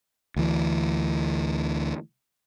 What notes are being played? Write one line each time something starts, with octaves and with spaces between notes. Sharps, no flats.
D2 E3